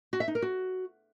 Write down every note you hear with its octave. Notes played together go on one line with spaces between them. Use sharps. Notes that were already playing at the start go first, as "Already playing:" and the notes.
F#4
E5
D#4
A#4
F#4